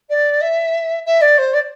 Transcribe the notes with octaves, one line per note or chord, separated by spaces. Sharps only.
D5
E5
E5
D5
C5
D5